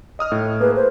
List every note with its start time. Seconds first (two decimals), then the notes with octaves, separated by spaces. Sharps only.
0.19 D#5 D#6 F6
0.32 A2
0.60 A#3 G#4 B4
0.76 C5